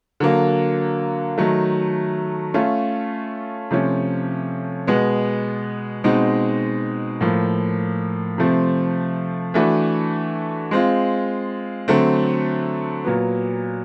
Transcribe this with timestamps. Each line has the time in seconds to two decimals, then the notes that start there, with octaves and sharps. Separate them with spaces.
0.20 D3 F#3 A#3
1.38 D#3 F#3 A3
2.54 A3 C#4 F4
3.71 C3 F3 A3 C#4
4.87 B2 G#3 B3
6.04 B2 G#3 C4 D#4
7.21 A2 F3 A#3
8.38 C3 F3 A3 C4
9.54 E3 A3 D4 F#4 B4
10.71 G#3 C4 F4
11.88 D3 F#3 A3 C4
13.05 A#2 F#3 B3